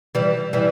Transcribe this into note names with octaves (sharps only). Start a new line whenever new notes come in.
E3 G3
E3 G3